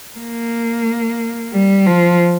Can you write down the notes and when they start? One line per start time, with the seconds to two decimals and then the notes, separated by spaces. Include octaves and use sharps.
0.18 A#3
1.53 G3
1.86 F3